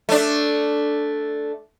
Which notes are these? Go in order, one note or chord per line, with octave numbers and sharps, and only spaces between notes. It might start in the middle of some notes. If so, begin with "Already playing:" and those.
A3 D4